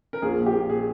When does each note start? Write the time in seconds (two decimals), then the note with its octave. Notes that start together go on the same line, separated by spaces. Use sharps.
0.13 A#4
0.22 A#1 G#4
0.38 A#2
0.46 G4
0.54 A#2
0.70 G#4